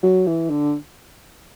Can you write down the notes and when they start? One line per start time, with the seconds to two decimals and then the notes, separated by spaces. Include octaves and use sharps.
0.03 F#3
0.27 E3
0.50 D3